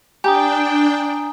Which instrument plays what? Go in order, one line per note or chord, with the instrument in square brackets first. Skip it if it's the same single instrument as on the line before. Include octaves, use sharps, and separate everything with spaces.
[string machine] D4 G5 [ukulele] G4 [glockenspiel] G#5 A#5 D#6